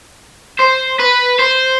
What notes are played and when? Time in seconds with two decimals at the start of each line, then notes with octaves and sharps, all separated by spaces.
0.60 C5
0.99 B4
1.39 C5